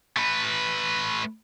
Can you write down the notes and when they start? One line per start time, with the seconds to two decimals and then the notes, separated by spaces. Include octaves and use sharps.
0.17 A3 B4